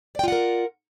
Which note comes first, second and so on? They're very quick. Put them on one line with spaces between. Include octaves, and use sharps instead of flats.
D5 G5 F4 F#5 A#4